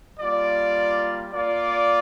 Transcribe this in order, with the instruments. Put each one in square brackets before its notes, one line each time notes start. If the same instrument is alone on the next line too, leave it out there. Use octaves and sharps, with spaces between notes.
[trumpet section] G3 A#3 F4 D5
A#3 F4 D5